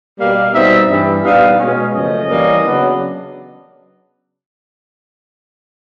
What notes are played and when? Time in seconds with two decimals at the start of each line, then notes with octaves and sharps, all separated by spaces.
0.18 B2 G3 A#3 F5
0.53 B2 G3 C4 D#4 E5
0.88 G2 E3 G3
1.24 A#2 G3 B3 D#4 F5
1.59 B2 G#3 C#4
1.94 F#2 C#3 F3 A3 C#4 D#5
2.30 E3 G3 A#3 C#4
2.65 C#3 F#3 B3 D4